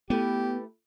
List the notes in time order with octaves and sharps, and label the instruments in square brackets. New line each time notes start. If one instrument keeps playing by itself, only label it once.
[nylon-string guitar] A3 E4 B4 [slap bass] B3 [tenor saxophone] G4